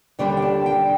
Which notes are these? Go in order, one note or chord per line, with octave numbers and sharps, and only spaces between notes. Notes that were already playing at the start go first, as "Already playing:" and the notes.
D#2 D3 G3 D4 D5
G5
A5
G5